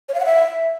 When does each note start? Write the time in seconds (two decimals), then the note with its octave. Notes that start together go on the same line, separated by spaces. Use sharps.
0.09 C#5
0.14 F5
0.20 F#5
0.25 E5